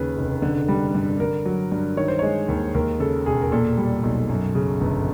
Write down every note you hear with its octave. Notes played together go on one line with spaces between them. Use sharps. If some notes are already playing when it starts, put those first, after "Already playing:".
Already playing: D#2 C#3 B4
F1
D3
G3
G2
D3 A#4
F#3
G2
D#3 C#5
C5
G#3 C#5
D#2
D#2 A#4
C#3 A4
E1 G#4
A#4
A#2 A4
G3
B1
F#2
C#3
G1